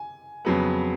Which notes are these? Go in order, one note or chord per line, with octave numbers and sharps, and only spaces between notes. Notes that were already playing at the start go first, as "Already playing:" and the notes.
Already playing: G#5
F2 C#3 F#3 B3